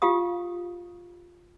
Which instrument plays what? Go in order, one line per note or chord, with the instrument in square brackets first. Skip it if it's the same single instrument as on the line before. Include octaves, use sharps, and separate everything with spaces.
[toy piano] F4 G4 F5 D#6